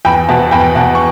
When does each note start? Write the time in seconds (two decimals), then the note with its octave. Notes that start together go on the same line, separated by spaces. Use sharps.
0.05 E2 G5 B5
0.29 B2 F#5 A5
0.51 E2 G5 B5
0.75 B2 F#5 A5
0.95 C#6